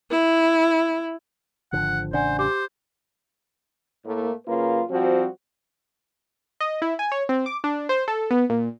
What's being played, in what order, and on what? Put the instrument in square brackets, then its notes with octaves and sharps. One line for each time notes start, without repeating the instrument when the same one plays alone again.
[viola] E4
[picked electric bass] G#1 D3 F3 [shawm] F#5
[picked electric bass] A1 C#3 D4 [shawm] C5 [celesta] D5 F#5 G#5
[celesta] G4 D6 [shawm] C5
[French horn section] A2 A3 A#3
C#3 F#3 A#3 F4 B4
F3 G3 C4 F#4
[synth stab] D#5
E4
G#5
C#5
C4
D6
D4
C5
A4
B3
A#2